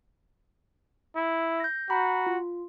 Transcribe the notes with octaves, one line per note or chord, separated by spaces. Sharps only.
E4
G6 A#6
F#4 G#5 A#5 B5
F4